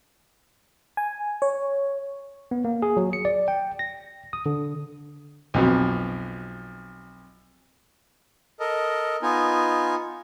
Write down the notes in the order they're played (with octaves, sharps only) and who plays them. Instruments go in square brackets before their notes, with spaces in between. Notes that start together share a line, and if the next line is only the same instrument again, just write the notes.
[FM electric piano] G#5
C#5
[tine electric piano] B3
A#3
G#4
F#3
C#7
D5
G5
A#6
D#6
D3
[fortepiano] B1 F2 B2
[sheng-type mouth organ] A4 A#4 D#5
B3 D#4 F4 G#5